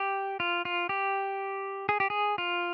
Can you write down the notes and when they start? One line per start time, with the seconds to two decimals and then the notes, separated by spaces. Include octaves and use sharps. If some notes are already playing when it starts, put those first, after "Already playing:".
Already playing: G4
0.40 F4
0.65 F4
0.89 G4
1.89 G#4
2.00 G4
2.10 G#4
2.38 F4